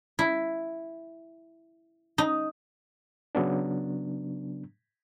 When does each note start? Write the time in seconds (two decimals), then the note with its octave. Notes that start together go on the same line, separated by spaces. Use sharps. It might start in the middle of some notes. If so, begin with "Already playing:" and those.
0.19 E4
2.18 D#4
3.35 C#3 F#3 B3 D4